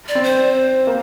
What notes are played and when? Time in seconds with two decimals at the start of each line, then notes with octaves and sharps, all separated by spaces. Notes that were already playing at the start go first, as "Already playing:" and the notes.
0.08 D5
0.15 C4
0.23 C5
0.87 A#3